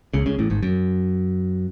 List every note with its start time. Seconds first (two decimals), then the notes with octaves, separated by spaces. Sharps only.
0.14 C#2 C#3
0.26 C#2 C#3
0.39 A1 A2
0.50 G#1 G#2
0.63 F#2